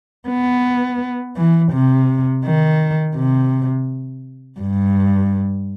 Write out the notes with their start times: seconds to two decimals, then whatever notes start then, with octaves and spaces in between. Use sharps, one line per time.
0.29 B3
1.37 E3
1.73 C3
2.45 D#3
3.16 C3
4.60 G2